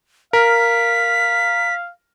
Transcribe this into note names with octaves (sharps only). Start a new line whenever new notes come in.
A#4 F5 B6